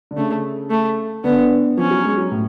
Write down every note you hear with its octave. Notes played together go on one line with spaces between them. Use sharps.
D3
C#3 A3
A3
D3 B3
F3 C#4
F#3
G#3
F#3
A2